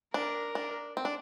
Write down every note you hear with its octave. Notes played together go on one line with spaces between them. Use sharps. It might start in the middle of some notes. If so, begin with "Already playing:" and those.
D4 A#4
D4
C4
D4